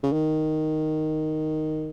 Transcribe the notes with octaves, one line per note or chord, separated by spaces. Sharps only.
C#3
D#3